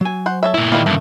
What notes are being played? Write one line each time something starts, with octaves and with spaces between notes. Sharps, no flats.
F#3 G#5
C5 F#5
A4 C#5 E5
A#2 A3 E4
D#3 E3 G3 A#3 D#4 F4
G2 C#3 A3